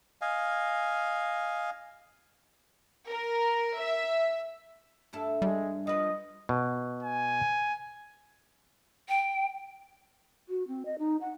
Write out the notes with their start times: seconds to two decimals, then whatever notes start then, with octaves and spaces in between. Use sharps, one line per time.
0.21 D#5 F5 G#5
3.09 A#4
3.81 E5
5.13 G2 E4 A4
5.42 G3 G#3
5.87 F3 B4 D#5
6.49 B2
7.03 G#5
9.09 G5
10.49 F#4
10.68 C4
10.85 D#5
10.99 D#4
11.21 F#5